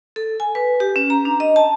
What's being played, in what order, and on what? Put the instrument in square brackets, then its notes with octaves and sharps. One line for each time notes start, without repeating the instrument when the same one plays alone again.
[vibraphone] A4
G#5
B4
G4
C#4
A#5
D4
D#5
A5